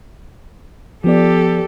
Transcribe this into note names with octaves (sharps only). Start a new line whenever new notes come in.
F3 B3 G4 A4 D5